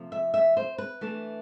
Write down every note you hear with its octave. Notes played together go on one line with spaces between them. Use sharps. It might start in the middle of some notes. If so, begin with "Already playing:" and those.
Already playing: C3 F3 A3
E5
E5
C5
B4
E3 A3 D4